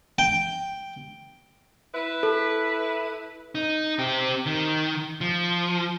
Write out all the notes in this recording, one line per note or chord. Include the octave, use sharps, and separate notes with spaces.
G5
E4 B4
A4
D#4
C4 G4
D#3
F3